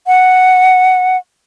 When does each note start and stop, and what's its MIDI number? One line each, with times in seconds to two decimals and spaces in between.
0.07 1.17 78